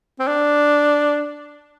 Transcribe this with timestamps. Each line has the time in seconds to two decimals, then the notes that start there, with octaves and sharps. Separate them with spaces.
0.19 C4
0.28 D4